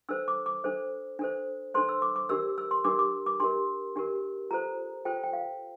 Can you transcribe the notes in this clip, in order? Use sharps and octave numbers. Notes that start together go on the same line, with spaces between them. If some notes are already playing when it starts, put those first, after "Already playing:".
D4 A4 C5 E6
D6
D6
D4 A4 C5
D4 A4 C5
D4 A4 C5 C6
E6
D6
D6
D4 G4 A#4 E6
E6
C6
D4 G4 A#4 D6
D6
D6
D4 G4 A#4 C6
D4 G4 A#4
F4 A4 C5 A#5
F4 A4 C5 G5
G5
F5